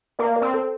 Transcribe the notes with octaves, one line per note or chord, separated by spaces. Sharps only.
A#3 A#4 D5
A#4 D5
C4
A4 C5